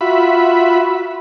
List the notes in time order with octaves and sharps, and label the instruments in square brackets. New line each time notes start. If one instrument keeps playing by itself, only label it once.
[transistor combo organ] F4 F#4 E5 B5